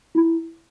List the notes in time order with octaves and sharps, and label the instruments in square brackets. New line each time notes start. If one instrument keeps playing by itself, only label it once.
[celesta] E4